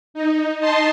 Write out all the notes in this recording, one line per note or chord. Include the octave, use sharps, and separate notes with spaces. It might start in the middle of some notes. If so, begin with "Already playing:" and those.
D#4
D#4 D#5 A5 C6